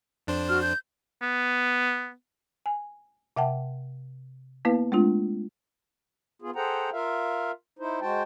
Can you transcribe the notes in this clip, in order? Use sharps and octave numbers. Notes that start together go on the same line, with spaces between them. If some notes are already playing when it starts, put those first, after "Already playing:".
F2 D4 C5
F#4 F6
G6
B3
G#5
C3 E5 F#5 G5 A5
A#3 B3 E4 B4 F5
G#3 A3 C4 D4 F4
B3 F4 G#4
G#4 A4 C5 F#5 G5 A#5
F4 A#4 E5 F5
D#4 E4 C5
G#3 F#4 C5 G5 A5